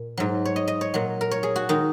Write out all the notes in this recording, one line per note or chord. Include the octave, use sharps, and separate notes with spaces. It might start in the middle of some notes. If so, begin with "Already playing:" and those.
Already playing: A#2 A#4
G#2 F#3
C#5
D#5
D#5
C#5
A#2 F#3
A#4
C#5
G#4
F#4
D#3 G#3 D#4